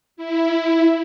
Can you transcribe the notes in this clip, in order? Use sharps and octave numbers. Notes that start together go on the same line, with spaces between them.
E4